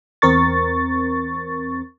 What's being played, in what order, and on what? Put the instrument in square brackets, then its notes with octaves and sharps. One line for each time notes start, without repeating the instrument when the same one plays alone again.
[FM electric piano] E2 C4 A#4 C#6 A6